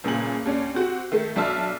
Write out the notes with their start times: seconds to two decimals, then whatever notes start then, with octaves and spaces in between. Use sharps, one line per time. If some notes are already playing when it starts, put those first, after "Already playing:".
0.04 G1 A#2 C#3 G#4 G#5 F#7
0.46 D#2 C#4 D4
0.75 C4 F#4 G4
1.12 D#3 A3
1.36 B1 D4 E5 A5 F6